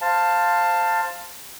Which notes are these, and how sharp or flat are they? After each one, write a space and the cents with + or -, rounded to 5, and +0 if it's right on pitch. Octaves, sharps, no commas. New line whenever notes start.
C5 +0 F5 +0 A5 +15